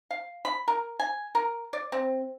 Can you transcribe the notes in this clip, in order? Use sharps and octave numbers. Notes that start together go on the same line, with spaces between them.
F5
B5
A#4
G#5
A#4
D5
C4